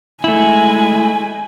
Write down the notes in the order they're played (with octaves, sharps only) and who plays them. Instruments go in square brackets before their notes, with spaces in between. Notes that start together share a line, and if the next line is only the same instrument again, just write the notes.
[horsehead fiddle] G#3 G#5 [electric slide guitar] A3 E4